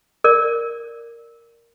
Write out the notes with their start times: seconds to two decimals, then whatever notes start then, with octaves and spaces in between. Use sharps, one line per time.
0.24 A#4 D5